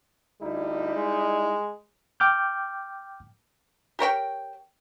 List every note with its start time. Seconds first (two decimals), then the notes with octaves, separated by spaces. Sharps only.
0.42 D2 G3 D#4 E4
0.95 G#3
2.20 G5 D6 F6 G6
3.99 G4 A#4 C#5 G5